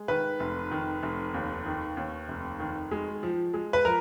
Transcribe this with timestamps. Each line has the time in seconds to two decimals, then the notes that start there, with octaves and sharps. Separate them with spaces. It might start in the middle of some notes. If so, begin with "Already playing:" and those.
Already playing: G#3
0.08 D#3 B4
0.40 F1
0.71 D#3
1.03 F1
1.34 D#2
1.66 D#3
1.97 D#2
2.28 F1
2.59 D#3
2.91 G#3
3.23 F3
3.54 G#3
3.73 B4
3.85 F3 A#4